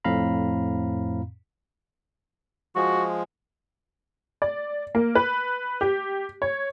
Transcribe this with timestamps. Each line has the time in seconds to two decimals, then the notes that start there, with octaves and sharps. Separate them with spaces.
0.04 F2 A2 C4 F5 A#5 B5
2.76 F3 G#3 F#4
4.42 D5
4.95 A#3
5.15 B4
5.81 G4
6.42 C#5